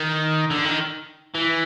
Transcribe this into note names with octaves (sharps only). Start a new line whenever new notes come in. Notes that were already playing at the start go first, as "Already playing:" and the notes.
Already playing: D#3
D3
D#3
E3